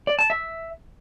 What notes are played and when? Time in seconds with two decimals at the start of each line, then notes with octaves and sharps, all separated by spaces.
0.07 D5
0.19 A5
0.30 E5